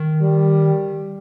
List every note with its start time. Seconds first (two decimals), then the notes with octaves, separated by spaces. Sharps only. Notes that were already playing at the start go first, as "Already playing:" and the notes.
Already playing: D#3
0.22 G3